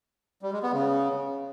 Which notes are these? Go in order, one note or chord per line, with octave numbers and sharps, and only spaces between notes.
G3
G#3
B3
C#3